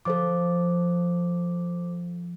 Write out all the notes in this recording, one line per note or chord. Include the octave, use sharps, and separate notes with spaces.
F3 A4 C5 D6